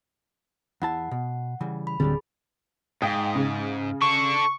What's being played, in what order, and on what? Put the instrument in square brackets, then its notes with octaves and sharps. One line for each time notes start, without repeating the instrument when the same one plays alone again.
[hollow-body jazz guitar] E2 E4 A5 [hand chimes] F#5
[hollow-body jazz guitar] B2
C#3 E3 G3
[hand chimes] B5
[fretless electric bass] D1 D3 C4 [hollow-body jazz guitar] A2 F#3 G3 [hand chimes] G#4
[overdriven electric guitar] G#2 [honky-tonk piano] F5 G5 D#6
[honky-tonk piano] C#3
[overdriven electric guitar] D4 A4 [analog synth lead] C#6